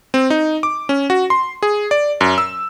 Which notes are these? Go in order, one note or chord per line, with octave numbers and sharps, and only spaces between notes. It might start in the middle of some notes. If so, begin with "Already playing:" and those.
C4
D#4
D6
C#4
F#4
C6
G#4
D5
F#2
E6